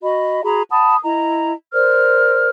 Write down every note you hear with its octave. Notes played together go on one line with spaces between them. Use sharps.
F#4 D#5 B5
F#4 G#4 A#5 B5
F#5 A5 B5 D#6
E4 D#5 A#5
A#4 C5 D5 F6